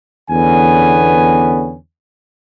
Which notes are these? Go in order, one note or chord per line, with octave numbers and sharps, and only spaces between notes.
E2 D3 B3 C#4 G#5